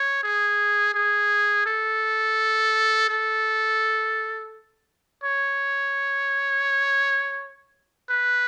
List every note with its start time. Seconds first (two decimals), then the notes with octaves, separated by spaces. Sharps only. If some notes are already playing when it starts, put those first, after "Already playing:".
Already playing: C#5
0.23 G#4
0.95 G#4
1.66 A4
3.09 A4
5.23 C#5
8.10 B4